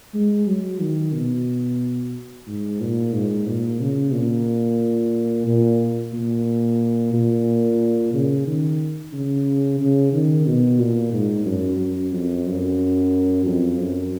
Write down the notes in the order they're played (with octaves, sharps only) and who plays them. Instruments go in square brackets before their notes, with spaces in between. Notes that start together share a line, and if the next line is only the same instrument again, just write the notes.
[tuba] G#3
F#3
D#3
B2
G#2
A#2
G#2
A#2
C#3
A#2
A#2
A#2
A#2
C#3
D#3
C#3
C#3
D#3
B2
A#2
G#2
F#2
F#2
F2
F#2
F2
F#2